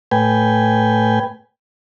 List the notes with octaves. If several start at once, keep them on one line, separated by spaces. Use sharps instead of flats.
A2 B4 G5 G#5